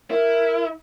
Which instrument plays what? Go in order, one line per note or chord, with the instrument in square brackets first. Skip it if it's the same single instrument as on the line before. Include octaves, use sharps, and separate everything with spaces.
[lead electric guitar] E4 [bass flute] A#4